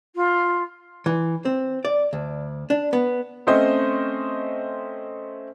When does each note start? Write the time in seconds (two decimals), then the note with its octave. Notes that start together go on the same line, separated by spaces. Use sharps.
0.15 F4
1.06 E3
1.45 C4
1.85 D5
2.13 D2
2.70 D4
2.93 B3
3.47 A3 C4 C#4 C5 D#5